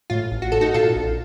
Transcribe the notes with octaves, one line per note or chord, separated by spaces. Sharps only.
A2 F4
A1
F#4
A2 A4
D#4 F#4
A#2 F4 A4
A#1